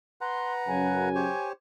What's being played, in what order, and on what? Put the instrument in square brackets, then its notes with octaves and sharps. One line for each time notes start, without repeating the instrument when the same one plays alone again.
[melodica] B4 F#5 A#5 [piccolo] C6
[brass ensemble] F#2 C#3 [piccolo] G#5
[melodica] G4 C5 C#5